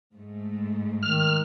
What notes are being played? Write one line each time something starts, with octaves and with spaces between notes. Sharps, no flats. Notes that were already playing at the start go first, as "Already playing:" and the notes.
G#2 A3
D#3 F6